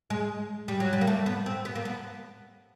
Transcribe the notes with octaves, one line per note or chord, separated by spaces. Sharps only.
G#3
G3
F#3
G3
A#3
A3
B3
C4
B3
A#3
B3